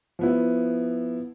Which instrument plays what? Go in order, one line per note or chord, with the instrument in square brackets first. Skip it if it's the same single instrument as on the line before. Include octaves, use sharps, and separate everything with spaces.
[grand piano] F3 B3 E4